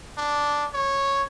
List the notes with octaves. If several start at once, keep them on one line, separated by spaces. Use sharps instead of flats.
D4
C#5